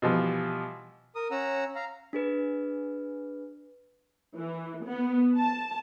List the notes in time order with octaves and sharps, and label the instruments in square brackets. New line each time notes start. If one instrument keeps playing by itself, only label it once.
[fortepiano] B2 E3 F3 G3
[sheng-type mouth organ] A#4 D#6
C#4 F#5 A#5 E6
F5 A#5
[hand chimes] D4 G#4 B4
[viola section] E3
B3
A5